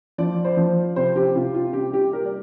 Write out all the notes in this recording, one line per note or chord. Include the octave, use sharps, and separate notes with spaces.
F3 D5
C5
F3
C3 C5
G4
C3 F4
F4
G3 G4
G4
G3 A#4
D5